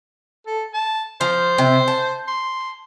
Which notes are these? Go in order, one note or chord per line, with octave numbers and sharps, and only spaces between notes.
A4
A5
F3 C5
C3
A5
C6